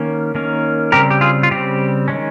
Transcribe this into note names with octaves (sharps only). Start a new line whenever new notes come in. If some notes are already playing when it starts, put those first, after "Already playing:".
Already playing: D#3 A#3 C#4
D#3 A#3 C#4
C#3 G3 C4 G4 A#4
G4
F4 G#4
F4
C#3 G3 C4 G4
D#3 G#3 C#4